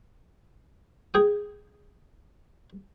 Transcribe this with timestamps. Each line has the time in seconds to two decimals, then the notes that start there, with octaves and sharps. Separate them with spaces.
1.14 G#4 G5 D#6